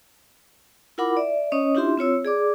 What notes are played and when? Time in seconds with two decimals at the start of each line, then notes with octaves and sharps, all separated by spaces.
0.98 E4 F4 A#4 F#5 B5 D6
1.17 D5 E5
1.52 C#4 C#5 D#5 D#6
1.75 D4 E4 F4 G4 E5 C6
1.97 C4 F4 C#5 E6
2.25 G#4 D5 D6